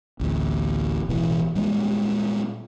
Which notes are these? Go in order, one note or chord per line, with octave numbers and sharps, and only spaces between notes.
A1 D2
A1 B2 E3
A#2 G3 G#3 B3